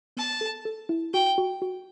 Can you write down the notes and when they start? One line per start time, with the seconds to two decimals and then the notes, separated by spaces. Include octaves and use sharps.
0.17 B3 A5
0.41 A4
0.65 A4
0.89 E4
1.14 F#4 G5
1.38 F#4
1.62 F#4